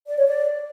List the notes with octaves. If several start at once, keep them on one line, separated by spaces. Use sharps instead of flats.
D5
C#5
D5